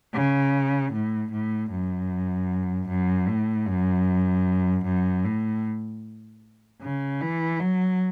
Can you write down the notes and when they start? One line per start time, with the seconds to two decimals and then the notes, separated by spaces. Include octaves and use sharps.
0.14 C#3
0.93 A2
1.31 A2
1.71 F#2
2.89 F#2
3.28 A2
3.67 F#2
4.85 F#2
5.24 A2
6.81 C#3
7.21 E3
7.60 F#3